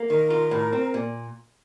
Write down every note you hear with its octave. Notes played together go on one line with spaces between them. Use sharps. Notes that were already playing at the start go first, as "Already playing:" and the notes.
Already playing: A#3
D#3 A#4
F4
A2
C4
A#2